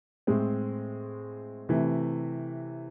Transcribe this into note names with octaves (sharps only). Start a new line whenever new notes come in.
A2 G#3 C4
C3 E3 A3